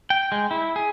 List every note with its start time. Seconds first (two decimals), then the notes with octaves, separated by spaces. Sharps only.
0.10 G5
0.32 G#3
0.51 E4
0.76 G#4